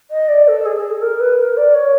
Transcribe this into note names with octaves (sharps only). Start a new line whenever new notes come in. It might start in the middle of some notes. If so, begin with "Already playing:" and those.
D#5
D5
A4
G#4
G#4
A4
A#4
B4
A#4
D5
C#5